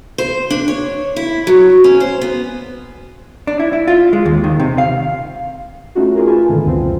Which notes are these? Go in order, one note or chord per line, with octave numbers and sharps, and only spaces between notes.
C5
D4
C#5
E4
F#3
C#4
C5
B3
D4
E4
E4
F4
G#3
D#2
D#3
C3
F5
A3 C#4 D#4 F4 F#4
F4 G#4 A#4
F4 B4 G#5 A5
G#2 B2 D3 D#3 A3
C#2 F#2 C4 F4